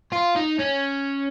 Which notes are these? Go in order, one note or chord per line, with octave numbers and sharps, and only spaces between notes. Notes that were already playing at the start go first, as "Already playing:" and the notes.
F4
D#4
C#4